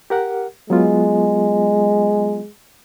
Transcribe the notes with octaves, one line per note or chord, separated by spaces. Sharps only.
G4 A#4 F#5
F#3 G#3 B3 F4